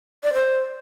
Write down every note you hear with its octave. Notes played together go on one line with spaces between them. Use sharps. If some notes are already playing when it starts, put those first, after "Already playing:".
D5
C5